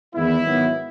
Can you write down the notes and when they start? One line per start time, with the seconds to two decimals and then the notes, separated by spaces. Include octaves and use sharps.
0.14 E2 D#3 G#3 B3 E4
0.43 G#2 D#3 F#3 B3